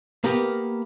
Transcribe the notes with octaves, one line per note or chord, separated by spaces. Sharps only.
A#3 B3 G4 A#4